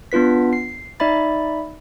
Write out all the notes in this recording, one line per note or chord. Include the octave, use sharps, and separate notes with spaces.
B3 D4 F4 B4 B6
C7
D#4 D5 E5 B5 A6